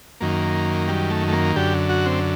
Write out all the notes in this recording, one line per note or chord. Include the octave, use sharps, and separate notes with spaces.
F#2 D#3 A#3
G3
A3
A3
A#3
F#2 D3 G4
F#4
C4